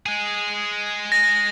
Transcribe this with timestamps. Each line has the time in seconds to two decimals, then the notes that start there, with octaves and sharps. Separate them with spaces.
0.06 G#3 G#4
1.12 A#6